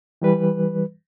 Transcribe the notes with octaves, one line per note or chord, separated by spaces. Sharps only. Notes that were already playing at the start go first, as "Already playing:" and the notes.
E3 G3 B4